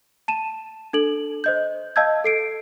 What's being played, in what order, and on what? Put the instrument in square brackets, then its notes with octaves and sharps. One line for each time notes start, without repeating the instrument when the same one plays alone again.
[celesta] A5 D#7 E7
D4 A4 F#7
C5 D#5 G6
D#5 F5 A5 E6 G6 G#6
A4 C7 D7